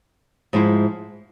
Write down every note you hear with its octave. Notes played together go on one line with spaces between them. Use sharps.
G#2 F3 G#3 E4